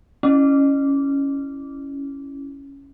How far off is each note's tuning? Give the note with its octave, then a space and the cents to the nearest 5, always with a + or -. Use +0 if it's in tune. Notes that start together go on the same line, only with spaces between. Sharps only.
C#4 +0 E4 +0